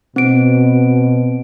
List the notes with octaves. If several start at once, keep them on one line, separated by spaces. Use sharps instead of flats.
B2 C4 D7